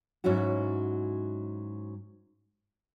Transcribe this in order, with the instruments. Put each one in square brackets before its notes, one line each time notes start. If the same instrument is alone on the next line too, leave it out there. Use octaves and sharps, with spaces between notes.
[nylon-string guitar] G#2 F#3 C#4 E4 F#4